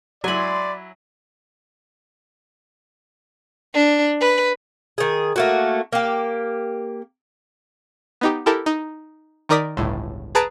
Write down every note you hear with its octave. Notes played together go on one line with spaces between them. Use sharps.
F#3 E4 D5 G#5 B5 C6
D4
B4
D#3 G#4
A3 A#3 F#4
A#3 G4
B3 D#4 G4
E4 G4 A4 A#4
D#4
D#3 D#4 A#4 D5 D#6 B6
G1 C#2 A2
G#4 B4 A5 A#5 A6 D7